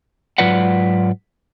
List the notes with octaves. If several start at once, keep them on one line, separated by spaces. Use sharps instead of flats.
G#2 F#3 F4 B4 D5 F#5